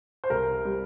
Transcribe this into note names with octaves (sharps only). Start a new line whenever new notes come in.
C5
C2 A#4
G3